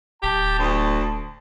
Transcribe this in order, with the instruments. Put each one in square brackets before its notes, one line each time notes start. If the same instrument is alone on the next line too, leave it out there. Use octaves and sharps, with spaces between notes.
[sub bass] D1 [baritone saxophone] G4 [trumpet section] A5
[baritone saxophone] D2